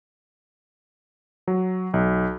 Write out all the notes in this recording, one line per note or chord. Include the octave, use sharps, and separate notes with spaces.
F#3
B1